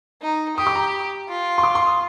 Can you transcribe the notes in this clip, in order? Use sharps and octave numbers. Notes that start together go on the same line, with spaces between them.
D#4
G4 D#6
D6
A#5
F4
C6
D6
C6
D#6